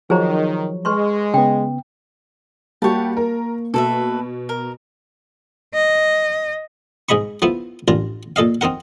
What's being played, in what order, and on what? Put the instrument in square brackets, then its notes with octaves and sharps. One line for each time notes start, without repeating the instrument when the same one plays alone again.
[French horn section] D#3 [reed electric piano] F3 F#3 C#5 [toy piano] G#4 C5 A#5
[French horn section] G#3 [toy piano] B4 C6 C#6
[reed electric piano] C#3 B3 [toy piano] G5
[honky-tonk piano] G3 F#4 G4 [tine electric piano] A#3 [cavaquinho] C#5 A5
[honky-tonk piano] A#4
[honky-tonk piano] B2 [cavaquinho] A4 B4 E5
[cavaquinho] A#4
[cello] D#5
[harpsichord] G#2 G#4 D#5 B5 C#6
F3 A3 B3 E4
A1 D4 F4 A#4
A#2 A4 D#5 F5
C4 D#4 A#4 F#5